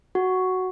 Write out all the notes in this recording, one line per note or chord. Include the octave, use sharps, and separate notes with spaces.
F#4